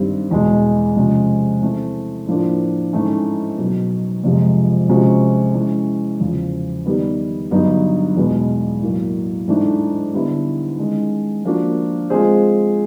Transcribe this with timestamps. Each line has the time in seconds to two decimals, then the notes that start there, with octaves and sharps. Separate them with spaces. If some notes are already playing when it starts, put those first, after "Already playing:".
Already playing: G2 D#3 G3 C4
0.31 E2 B2 G#3
0.96 C3 F3 G#3 C#4
1.61 E3 A3 C4
2.27 A2 F3 A#3 D4
2.93 G#2 E3 A3 C#4
3.58 B2 F#3 B3
4.24 F2 C3 F3 G#3
4.89 C3 F3 G#3 C#4 F#4
5.55 E3 G#3 C#4
6.20 E2 C#3 F3
6.86 D#3 G3 B3
7.51 G2 D3 F#3 B3 D#4
8.16 E2 B2 G#3 B3
8.82 A2 F#3 A#3
9.48 G#2 E3 A3 D4
10.14 D3 G3 B3 E4
10.79 D#3 G#3 C#4
11.45 F3 A#3 D4 F#4
12.10 G#3 C4 F4 G#4 C5